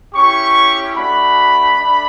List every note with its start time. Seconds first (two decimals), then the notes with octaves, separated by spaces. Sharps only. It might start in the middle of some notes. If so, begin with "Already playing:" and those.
0.14 C#4 E4 G4 C#6
0.96 A3 D4 F#4 B5
1.77 A3 D4